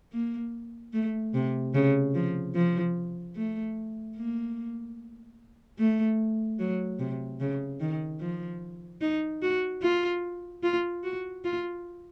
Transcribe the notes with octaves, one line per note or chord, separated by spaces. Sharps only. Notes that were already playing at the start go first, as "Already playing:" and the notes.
A#3
A3
C3
C#3
F3
F3
A3
A#3
A3
F#3
C3
C#3
D#3
F3
D#4
F#4
F4
F4
F#4
F4